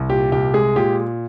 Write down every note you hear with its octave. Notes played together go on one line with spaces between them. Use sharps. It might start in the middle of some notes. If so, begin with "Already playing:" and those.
Already playing: C2
A#2 G4
C2 G4
G#3 G#4
A#2 G4